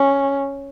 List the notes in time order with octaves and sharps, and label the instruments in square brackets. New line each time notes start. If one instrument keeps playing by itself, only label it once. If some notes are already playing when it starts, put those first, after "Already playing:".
Already playing: [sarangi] C#4